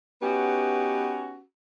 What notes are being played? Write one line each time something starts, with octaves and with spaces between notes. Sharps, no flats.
B3 C#4 D#4 F#4 G4 B4